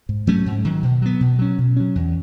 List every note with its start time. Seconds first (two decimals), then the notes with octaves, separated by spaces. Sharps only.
0.09 G#2
0.27 F#3 A3 C#4
0.46 G#2
0.65 D#3 F#3
0.83 B2
1.02 F#3 B3
1.20 B2
1.39 F#3 C#4
1.58 B2
1.76 F#3 C#4
1.95 E2